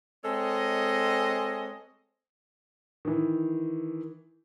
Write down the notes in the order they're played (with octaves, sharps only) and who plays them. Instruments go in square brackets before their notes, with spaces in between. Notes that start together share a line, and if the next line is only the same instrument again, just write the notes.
[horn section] G#3 C4 A4 C#5 D#5
[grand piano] D#3 E3